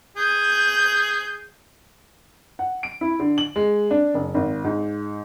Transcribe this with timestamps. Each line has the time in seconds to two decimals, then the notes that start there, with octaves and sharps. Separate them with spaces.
0.16 G#4 G6
2.59 F#5
2.83 D7
3.01 E4
3.20 D3
3.38 F#7
3.56 G#3
3.91 D4
4.14 F#1
4.34 G#1
4.64 G#2